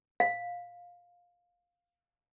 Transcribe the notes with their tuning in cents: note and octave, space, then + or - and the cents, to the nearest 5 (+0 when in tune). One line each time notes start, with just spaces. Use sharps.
F5 +10